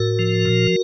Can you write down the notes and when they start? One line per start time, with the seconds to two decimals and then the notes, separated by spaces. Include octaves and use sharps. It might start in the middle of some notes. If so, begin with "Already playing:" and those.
Already playing: A2 F#4 A#4
0.19 F3
0.45 A#2